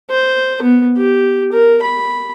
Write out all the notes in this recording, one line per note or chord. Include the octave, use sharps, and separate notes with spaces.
C5
B3
G4
A#4
B5